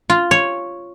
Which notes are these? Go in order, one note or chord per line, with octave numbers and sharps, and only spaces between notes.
F4
C#5